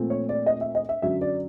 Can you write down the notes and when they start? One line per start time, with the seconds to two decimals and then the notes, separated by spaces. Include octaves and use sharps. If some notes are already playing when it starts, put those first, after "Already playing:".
Already playing: A#2 F3 A3 C4
0.10 C#5
0.29 D5
0.46 D#5
0.61 E5
0.75 D#5
0.89 E5
1.02 F#2 D3 F#3 E5
1.21 D5